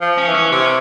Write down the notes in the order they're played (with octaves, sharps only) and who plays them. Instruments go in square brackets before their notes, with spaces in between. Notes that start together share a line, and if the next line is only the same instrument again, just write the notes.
[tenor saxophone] F3
[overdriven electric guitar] C#4
[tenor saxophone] E3
[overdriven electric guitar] C#4
[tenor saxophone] C3 [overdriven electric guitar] C#4